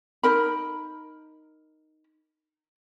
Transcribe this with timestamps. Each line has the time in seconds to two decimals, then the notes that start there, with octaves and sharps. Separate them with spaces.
0.23 D#4 A#4 B5